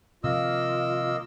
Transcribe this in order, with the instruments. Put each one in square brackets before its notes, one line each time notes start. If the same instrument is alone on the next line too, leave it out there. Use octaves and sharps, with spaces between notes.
[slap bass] C3 D#3 F3 [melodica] A#3 D#5 E6 [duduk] F4